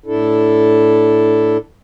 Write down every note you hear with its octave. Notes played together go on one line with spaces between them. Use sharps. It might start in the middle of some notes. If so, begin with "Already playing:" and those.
A2 D4 E4 A4